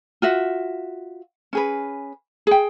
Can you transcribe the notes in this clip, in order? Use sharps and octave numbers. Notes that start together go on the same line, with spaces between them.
F4 F#4 E5
C#4 G#4 B4
G#4 G5